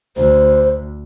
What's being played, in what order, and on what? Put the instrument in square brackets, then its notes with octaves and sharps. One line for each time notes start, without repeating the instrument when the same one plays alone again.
[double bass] D2 [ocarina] C5